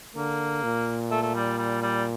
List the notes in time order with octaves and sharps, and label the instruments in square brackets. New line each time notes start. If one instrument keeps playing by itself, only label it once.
[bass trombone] D3 [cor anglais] A#3
[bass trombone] A#2
[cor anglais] A3
A3
G3
G3
G3